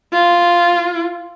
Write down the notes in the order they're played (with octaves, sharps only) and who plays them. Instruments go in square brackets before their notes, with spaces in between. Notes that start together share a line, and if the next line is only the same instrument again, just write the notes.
[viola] F4